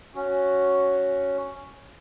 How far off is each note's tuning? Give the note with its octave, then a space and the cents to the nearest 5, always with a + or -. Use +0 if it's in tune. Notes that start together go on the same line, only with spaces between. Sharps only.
C#4 +0 F#4 +0